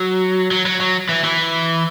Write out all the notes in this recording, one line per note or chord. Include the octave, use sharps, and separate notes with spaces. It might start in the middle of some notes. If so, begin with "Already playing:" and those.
Already playing: F#3
F#3
F#3
F#3
E3
E3